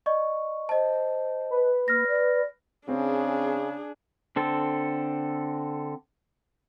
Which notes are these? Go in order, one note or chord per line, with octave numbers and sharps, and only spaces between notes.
D5 D#5 C#6
C5 D#5 A5
B4
A#3 F6 A#6
D5
C#3 C4 D4 G#4
D3 C4 A4